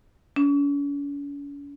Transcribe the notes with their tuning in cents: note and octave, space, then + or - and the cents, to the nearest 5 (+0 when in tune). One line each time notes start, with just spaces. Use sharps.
C#4 +45